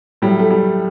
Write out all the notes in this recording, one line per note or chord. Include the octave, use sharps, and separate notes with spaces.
A2 F#3 G3
A3
G3